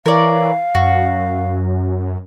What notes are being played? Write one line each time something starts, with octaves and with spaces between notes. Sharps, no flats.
E3 A#4 C#5 D5 F5
F#2 F#4